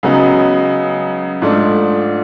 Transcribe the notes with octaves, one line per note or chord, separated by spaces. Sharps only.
C#3 F#3 B3 D#4
G#2 F3 A3 D4